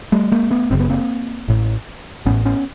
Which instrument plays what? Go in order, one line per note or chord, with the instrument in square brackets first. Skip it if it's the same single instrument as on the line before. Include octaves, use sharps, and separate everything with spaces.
[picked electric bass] G3 A3
G#3 A#3
A3 B3
F#1 F#2 C#3 C4
B3
A#3 C4
A1 A2
A1 A2 B3 C#4
B3 C#4